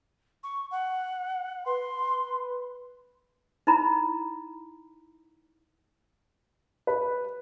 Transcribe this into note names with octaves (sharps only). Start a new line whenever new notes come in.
C#6
F#5
B4 C6
D#4 E4 A#5 B5
B4